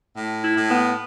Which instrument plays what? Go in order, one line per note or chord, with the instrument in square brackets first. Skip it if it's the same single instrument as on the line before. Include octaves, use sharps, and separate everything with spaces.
[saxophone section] A2
E4
A2
B3